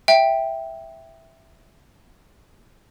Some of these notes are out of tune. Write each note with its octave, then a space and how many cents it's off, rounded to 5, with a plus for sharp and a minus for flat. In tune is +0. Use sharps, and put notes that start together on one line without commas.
E5 +0 G5 +0